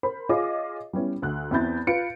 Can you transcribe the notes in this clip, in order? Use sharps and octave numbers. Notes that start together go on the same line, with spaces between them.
A#4 C5 B5
F4 G#4 C#5 D#5 D6
G3 B3 C#4 E4
D2 F#6
E2 C4 E4 B5 G6 A6
F4 B4 C#7 D7